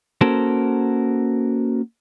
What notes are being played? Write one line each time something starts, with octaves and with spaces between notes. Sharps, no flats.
A#3 C#4 F#4 A4 A#4 C5